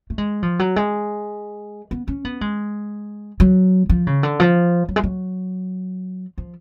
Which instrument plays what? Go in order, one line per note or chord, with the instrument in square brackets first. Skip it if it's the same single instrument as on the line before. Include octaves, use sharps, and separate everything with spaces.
[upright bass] A3
G#3
F3
F#3
G#3
B3
C#4
B3
G#3
F#3
F3
C#3
D3
F3
F#3
G#3
F#3
F3